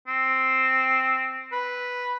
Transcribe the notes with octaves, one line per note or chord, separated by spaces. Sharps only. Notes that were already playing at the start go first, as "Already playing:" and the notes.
C4
B4